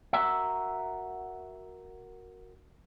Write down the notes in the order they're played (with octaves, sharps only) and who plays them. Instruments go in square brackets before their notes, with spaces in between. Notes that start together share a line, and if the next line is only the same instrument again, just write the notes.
[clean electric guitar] F#4 A#4 E5